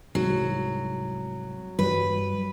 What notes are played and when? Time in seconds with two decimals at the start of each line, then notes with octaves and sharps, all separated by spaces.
0.15 C2 G#2 F#3
1.79 G2 F#3 G3 B4